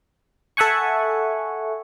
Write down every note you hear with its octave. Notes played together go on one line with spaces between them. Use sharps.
A4 E5 F#5 G#5 C#6